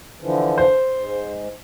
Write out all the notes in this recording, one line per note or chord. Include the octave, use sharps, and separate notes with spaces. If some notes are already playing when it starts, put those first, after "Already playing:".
D3 E3 F3
C5
G#2